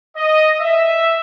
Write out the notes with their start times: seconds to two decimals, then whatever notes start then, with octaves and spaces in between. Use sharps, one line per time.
0.16 D#5
0.60 E5